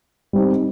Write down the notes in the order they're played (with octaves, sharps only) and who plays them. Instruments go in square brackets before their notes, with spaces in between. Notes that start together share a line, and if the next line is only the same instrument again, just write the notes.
[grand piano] G3 C4 D#4